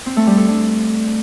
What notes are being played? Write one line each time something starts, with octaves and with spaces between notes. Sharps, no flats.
C4
A3
G3
A4
D4